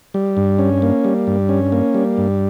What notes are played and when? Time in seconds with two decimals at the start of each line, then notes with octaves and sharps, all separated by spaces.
0.14 G3
0.37 G2
0.59 C#4
0.82 A#3
1.05 G3
1.27 G2
1.49 C#4
1.72 A#3
1.94 G3
2.18 G2